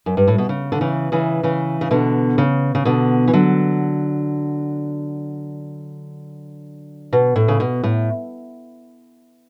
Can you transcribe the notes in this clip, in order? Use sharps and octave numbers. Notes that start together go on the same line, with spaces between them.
F#2
G2
A2
B2
C#3
D3
C#3 E3
C#3 E3
C#3 E3
C#3
B2 D3
C#3
C#3
B2 D3
E3
D3 F#3
B2
A2
C#3
B2
A2